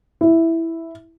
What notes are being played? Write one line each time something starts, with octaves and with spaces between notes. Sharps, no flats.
E4